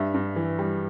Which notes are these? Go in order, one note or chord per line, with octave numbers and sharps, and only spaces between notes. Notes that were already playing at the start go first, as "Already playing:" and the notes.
Already playing: G2 E5
G2
E3
G3